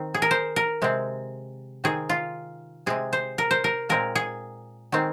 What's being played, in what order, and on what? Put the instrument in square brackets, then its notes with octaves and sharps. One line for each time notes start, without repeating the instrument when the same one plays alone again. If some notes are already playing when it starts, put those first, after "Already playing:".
Already playing: [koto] D#3 C4
G#4
A#4
C5
A#4
C3 G#3 C4
D#3 C4 G#4
F4
C3 G#3 C4 G#4
C5
A#4
C5
A#4
A#2 G#3 C4 A#4
G#4
D#3 G#3 C4